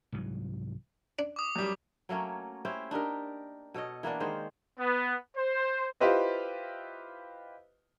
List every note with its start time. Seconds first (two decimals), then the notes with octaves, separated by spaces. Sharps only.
0.12 C2 G#2 E3 F#3
1.19 D4
1.36 D6 D#6
1.56 F#2 G3
2.09 F#3 A3 A#3 C#4
2.65 C#4 E4 G4 C5
2.91 D4 D#4 G4 A#4
3.74 B2 A4 C#5 D#5
4.03 E3 A#3 B3 D4
4.20 D#3 G#3 C5 C#5
4.79 B3
5.37 C5
6.00 E4 F4 G4 B4 C5 D#5